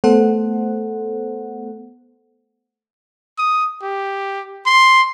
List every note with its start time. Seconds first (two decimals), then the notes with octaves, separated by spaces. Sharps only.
0.04 A3 B3 A4 C5 F#5
3.38 D#6
3.82 G4
4.66 C6